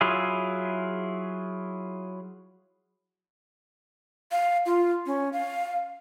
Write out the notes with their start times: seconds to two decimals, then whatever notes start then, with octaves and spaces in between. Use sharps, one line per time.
0.01 F#3 E4 F4 G#4
4.32 F5
4.66 F4
5.06 C#4
5.33 F5